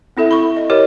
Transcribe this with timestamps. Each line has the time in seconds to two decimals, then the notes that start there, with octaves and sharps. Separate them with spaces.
0.17 C4 E4 A4 E5
0.31 B5 C#6
0.57 D#5
0.70 G4 A#4 C#5 D#5